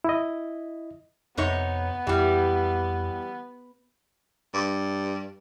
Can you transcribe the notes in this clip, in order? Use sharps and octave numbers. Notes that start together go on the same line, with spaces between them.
E4 D#5
F2 C3 B3 D#4 C#5
F2 E3 G3 E4 G4
G2